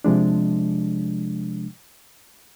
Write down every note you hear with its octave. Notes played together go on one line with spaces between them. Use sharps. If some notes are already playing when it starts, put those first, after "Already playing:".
C3 F3 G#3 D4